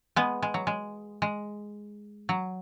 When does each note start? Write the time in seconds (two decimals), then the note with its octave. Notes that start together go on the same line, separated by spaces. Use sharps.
0.16 G#3 B3
0.42 G#3
0.54 F#3
0.67 G#3
1.22 G#3
2.29 F#3